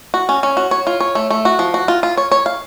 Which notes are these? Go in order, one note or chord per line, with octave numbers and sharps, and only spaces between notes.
F#4
C#4
C#4
F#4
C#5
F4
C#5
A3
A3
F#4
F3
F#4
F4
F4
C#5
C#5
F5